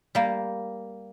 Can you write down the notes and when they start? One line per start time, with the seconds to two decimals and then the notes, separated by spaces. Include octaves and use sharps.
0.15 G3 A#3